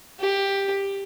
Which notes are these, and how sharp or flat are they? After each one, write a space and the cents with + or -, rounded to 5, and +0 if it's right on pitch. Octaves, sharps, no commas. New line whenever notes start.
G4 +10